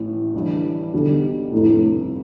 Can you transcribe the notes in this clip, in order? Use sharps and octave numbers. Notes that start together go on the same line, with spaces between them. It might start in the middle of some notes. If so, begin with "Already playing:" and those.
Already playing: A1 A2 E3
G1 G2 E3
B1 B2 D3 G3
G1 F2 A2 C3